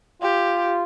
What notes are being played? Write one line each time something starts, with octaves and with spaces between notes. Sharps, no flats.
F4 G4